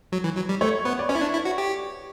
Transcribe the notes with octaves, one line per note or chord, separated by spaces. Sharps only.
F#3
E3
F#3
G3
A3 C#5
B3 B4
D5
C#4 C#5
E4
D4
E4
F#4
G4